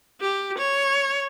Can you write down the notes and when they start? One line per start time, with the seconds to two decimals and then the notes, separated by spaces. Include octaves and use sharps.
0.20 G4
0.58 C#5